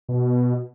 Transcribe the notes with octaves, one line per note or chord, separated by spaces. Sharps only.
B2